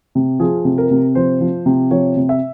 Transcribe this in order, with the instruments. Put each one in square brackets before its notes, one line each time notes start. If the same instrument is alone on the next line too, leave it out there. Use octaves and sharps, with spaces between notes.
[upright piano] C3
F3 G#4
C3
A#4
C3
F3 C5
F3
C3
F3 C#5
C3
E5